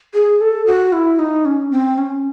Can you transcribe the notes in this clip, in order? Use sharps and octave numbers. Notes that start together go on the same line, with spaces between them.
G#4
A4
F#4
E4
D#4
C#4
C4
C#4